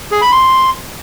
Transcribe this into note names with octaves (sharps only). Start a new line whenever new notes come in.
G#4
B5
C6